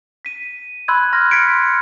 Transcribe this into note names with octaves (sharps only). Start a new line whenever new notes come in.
B6 D#7
B5 C6 E6 F#6 G#6
C6 F6 A#6
F6 G#6 B6 C#7 D7